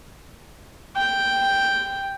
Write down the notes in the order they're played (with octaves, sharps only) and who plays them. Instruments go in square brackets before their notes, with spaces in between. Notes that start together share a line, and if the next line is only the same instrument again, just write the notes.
[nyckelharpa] G5